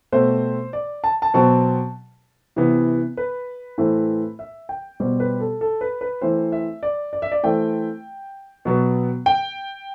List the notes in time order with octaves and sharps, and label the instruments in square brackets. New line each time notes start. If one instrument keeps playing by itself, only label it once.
[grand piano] B2 A3 C4 C5
D5
A5
A5
B2 F#3 C4 A5
C3 E3 B3
B4
A2 E3 A3 C4
E5
G5
B2 G3 C4
B4
A4
A4
B4
B4
E3 A3 C4 C5
E5
D5
D5
E5
D5
E3 A3 C4 G5
B2 F#3 B3
G5